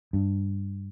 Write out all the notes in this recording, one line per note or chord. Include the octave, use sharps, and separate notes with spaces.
G2